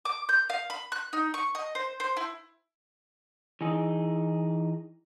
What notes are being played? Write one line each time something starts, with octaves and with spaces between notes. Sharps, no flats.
D6
G6
F5
B5
F#6
D#4
C#6
D#5
C5
C5
E4
E3 D#4 G#4